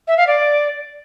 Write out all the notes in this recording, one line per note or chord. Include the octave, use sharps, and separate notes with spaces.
E5
F5
D5